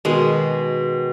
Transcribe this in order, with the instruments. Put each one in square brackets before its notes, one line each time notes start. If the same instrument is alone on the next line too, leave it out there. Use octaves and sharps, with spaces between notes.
[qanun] B2 D#3 G#3